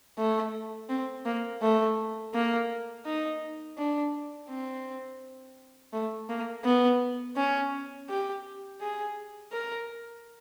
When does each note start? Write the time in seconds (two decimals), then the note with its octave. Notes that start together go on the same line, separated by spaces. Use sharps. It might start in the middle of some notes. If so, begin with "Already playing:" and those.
0.18 A3
0.89 C4
1.25 A#3
1.62 A3
2.34 A#3
3.06 D#4
3.78 D4
4.49 C4
5.93 A3
6.30 A#3
6.65 B3
7.36 C#4
8.09 G4
8.81 G#4
9.52 A#4